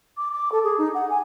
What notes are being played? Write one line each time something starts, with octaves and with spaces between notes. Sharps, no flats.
D6
D6
A4
G#4
D#4
F#5
G#5